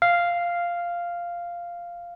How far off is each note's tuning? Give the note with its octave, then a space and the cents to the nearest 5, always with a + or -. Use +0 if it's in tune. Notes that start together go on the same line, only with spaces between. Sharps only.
F5 -5